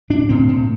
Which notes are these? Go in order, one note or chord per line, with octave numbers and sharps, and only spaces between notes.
A2 D4
A2 C4
A2